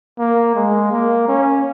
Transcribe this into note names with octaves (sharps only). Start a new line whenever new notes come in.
A#3
G#3
A#3
C#4